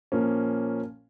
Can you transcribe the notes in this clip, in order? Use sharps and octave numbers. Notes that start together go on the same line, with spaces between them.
A#2 F3 A#3 C#4